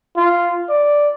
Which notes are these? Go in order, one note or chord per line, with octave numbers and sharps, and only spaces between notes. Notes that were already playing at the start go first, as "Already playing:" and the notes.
F4
D5